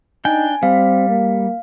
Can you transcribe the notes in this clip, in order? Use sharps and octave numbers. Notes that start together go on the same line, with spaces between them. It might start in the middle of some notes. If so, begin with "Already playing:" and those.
D4 D#4 G5 G#5
G3 C4 F5
A#3